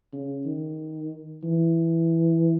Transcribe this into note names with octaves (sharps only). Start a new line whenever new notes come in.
C#3
D#3
E3